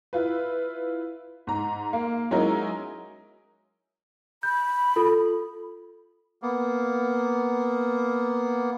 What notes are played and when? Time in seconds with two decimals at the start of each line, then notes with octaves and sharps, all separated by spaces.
0.13 E4 F4 B4
1.47 G#2 A#5
1.93 A#3 F5
2.31 F#3 G#3 C#4 D#4 E4 A#4
4.43 B5 G6
4.96 F4 A4
6.42 A#3 B3